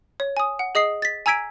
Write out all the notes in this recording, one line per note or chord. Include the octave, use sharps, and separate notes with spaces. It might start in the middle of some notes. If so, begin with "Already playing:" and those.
C#5
G#5 D#6
F#5
G#4 D#5 D#6 C7
A6 B6
G#5 A#5 E6 G#6 B6 D7